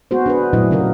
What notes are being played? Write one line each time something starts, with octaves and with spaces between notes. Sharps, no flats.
G#3 B3 F#4 G#4 C5
D4 G#4 B4
A#2 F#3 A3 D4 E4 D#5
C#3 A#3 F4 F#4 A#4